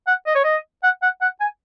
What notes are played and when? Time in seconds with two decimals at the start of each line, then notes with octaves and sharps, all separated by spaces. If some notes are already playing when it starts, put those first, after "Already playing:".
0.07 F#5
0.26 D#5
0.35 C#5
0.44 D#5
0.83 F#5
1.02 F#5
1.21 F#5
1.40 G#5